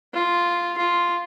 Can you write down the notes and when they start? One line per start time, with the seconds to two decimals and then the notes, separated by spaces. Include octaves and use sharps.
0.14 F4
0.78 F4